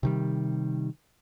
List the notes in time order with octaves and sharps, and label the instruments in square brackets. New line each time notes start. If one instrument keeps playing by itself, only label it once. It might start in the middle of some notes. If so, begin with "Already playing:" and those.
[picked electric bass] C3 D#3 G3